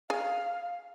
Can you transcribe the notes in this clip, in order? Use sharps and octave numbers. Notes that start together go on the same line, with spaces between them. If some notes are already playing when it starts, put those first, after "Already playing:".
G#4 F5 G#5